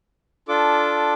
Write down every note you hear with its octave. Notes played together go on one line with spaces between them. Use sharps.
D4 F4 A4 D6